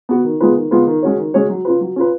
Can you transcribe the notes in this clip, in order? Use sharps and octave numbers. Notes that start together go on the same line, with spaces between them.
B3 F#4
D#3
G#3 B3 F4 B4
D#3
G#3 B3 F4 B4
D#3
G#3 C#4 F#4 C#5
D#3
G#3 C#4 F#4 C#5
F#3
C#4 F4 B4
F#3
C#4 F4 B4